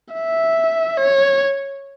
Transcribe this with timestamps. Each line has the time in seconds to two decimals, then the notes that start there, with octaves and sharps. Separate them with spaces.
0.13 E5
0.97 C#5